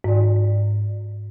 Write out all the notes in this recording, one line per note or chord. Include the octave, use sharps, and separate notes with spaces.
G#2 D5